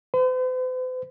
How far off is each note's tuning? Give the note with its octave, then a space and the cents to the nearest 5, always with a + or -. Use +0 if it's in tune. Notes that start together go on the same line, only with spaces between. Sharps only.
C5 -45